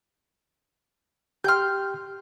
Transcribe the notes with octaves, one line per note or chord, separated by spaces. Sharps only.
G4 G5 C6 F6 G6